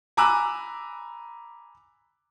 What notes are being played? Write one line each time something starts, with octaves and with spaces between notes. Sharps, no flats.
G#5 A#5 B5 D6 E6 F#6